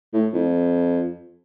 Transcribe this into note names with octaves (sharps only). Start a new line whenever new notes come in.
A2
F2